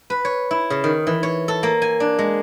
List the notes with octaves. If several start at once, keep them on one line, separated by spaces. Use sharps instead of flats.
B4
C#5
E4
C#3
D#3
E3
C#5
A4
A#3
G#5
D4
G#3